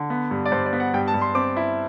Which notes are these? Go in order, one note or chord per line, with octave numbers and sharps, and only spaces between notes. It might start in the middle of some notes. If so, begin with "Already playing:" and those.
Already playing: D3
B3
G2
D5
G2 C5
D5
B3
F#5
G2 G5
A5
G2
C6
C4 D6
E4